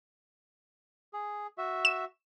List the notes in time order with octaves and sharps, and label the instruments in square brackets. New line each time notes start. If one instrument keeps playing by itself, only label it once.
[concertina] G#4
F#4 E5
[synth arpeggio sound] E7